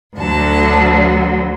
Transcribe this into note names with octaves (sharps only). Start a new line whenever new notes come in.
D2 D3 F#3 A5